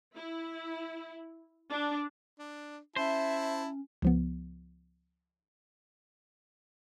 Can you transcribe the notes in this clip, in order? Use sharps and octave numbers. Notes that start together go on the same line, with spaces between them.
E4
D4
D4
C#4 E4 C5 E5 A5
C#2 F3 B3